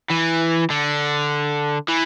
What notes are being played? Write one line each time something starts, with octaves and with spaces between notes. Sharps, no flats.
E3
D3
E3